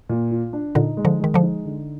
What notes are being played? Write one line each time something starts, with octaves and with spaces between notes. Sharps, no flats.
A#2
F4
D4
A#2 D3 D#4
G#3
D3 F3
D#3 G#3
D3 F3
D#4
D3